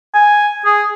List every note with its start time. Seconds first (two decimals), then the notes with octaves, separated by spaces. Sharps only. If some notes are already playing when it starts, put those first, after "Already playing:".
0.14 G#5
0.66 G#4